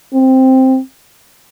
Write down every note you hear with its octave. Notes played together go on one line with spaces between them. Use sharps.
C4